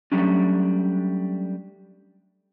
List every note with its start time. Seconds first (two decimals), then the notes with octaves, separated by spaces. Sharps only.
0.12 F#3 G3 A3 C#4 D4